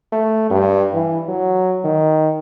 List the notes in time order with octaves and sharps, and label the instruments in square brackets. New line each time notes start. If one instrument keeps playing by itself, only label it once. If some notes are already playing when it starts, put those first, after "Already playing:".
[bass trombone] A3
G2
E3
F#3
D#3